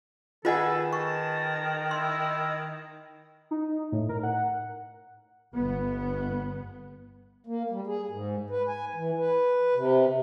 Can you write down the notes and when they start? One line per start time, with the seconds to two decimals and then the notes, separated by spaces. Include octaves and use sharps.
0.45 D#3 F4 G#4 A4 B4 D#5 F#5
0.93 A5 C#6
1.91 E4 C6
3.51 D#4
3.92 A2
4.09 A#4
4.23 F#5
5.54 G1 B3
7.47 A#3
7.70 G3
7.87 G#4
8.10 G#2
8.50 B4
8.68 G#5
8.95 E3
9.18 B4
9.75 C3